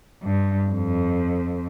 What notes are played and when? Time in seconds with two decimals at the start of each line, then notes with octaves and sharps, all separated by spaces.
0.23 G2
0.70 F2